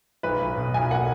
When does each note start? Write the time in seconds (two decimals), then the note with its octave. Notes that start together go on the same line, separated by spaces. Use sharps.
0.23 B1 B4
0.41 B1
0.57 B2
0.74 B1 G#5
0.91 A#3 F#5